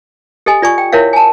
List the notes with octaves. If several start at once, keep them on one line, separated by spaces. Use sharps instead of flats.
G4 A4 D#5 G#5
F4 D5 G#5 C#6
G5
E4 A#4 C#5 E5 F5
G#5 A5